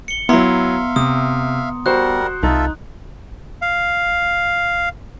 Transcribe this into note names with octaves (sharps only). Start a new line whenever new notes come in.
C#7 G7
F#3 B3 E4 E5 F5 A#5 C6
C3 D#6
G3 F#4 A#4 C5 F#5 F#6
C2 D#4 F4 A4 E5
F5